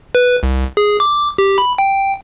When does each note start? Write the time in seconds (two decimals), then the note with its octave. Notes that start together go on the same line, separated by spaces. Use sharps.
0.15 B4
0.43 C2
0.77 G#4
1.00 D6
1.38 G4
1.58 B5
1.78 G5